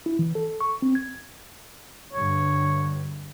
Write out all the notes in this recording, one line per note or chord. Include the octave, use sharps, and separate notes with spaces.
E4
E3
A4
C#6
C4
G#6
G2 D3 C#5